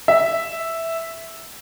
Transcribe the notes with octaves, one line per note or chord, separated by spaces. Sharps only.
E5